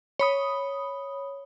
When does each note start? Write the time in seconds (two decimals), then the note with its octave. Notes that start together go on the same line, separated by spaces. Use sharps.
0.19 C#5 B5 D#6